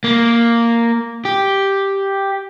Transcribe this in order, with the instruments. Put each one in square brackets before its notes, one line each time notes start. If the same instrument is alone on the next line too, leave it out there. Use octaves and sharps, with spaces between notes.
[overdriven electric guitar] A#3
G4